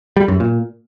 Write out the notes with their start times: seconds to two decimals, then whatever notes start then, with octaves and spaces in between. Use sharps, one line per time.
0.17 G3
0.28 F#2
0.40 A#2